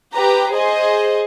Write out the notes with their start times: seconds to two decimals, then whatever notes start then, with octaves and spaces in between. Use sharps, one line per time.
0.14 G4 B4 A#5
0.52 G#4 C5 D#5